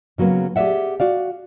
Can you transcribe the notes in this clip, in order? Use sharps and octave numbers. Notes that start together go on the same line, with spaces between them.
C#3 F#3 A#3 B3
G4 G#4 B4 D5 E5 F#5
F#4 D5 F5